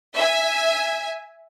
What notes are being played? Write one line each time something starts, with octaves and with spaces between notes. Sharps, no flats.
E5 G#5